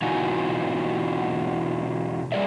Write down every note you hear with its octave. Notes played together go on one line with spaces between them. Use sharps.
B2 E3 D#4 F4 F#4 G#5
F#3 G3 G#4 A#4 D5 E5